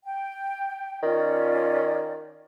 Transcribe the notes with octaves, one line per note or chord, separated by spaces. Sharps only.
G5
D#3 C#4 F4 D5